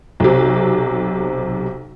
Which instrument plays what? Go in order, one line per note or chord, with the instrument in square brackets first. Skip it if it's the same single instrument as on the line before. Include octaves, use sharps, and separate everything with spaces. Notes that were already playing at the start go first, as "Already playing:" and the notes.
[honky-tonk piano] B1 C3